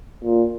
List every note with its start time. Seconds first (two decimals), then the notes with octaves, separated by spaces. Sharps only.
0.24 A#2